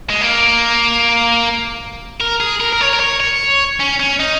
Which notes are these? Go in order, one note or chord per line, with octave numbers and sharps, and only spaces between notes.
G#3
A#3
A#4
G#4
A#4
A#4
C#5
A#4
C#5
C#5
C#4
C#4
D#4